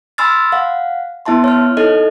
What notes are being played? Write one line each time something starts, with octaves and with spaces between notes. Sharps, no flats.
G#5 B5 C6 E6 F6 A6
F5 F#5
B3 E4 E5 A5 C6
C#5 F6
D#4 E4 A4 D#5